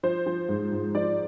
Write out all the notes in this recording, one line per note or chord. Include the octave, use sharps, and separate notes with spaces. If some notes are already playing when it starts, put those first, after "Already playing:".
F3 C5
F3
G#2
G#2
F3 D5